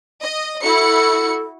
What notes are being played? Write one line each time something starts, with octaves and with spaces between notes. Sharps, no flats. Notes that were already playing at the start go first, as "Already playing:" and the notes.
D#5
E4 F#4 A4 C#7